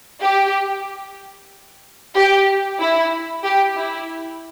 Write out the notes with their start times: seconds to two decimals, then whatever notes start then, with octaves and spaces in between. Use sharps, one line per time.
0.22 G4
2.16 G4
2.80 E4
3.44 G4
3.77 E4